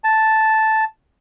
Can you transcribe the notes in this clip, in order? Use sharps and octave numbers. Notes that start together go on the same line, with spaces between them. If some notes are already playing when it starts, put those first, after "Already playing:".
A5